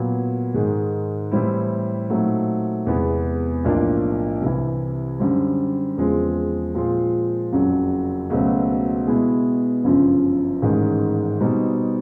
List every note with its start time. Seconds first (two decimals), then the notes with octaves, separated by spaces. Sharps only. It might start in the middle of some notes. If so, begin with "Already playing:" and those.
Already playing: A#2 F#3 B3
0.54 G#2 D#3 G#3
1.31 A2 E3 G3 C4 E4
2.10 A#2 F#3 A3 C4 D#4
2.87 E2 C3 E3 G#3 B3
3.64 B1 A2 F3 A#3 D4
4.41 C2 C3 E3
5.19 F#2 D3 G3 C4
5.97 E2 C#3 F3 G#3 C4
6.74 A#2 F3 G#3 C4 F4
7.52 F#1 F2 C#3 F#3
8.30 C#2 B2 F#3 A3 C4
9.07 B2 G#3 B3 E4
9.84 G1 F#2 C#3 F3
10.62 A1 G#2 D#3 G#3
11.40 B2 G3 C4 D#4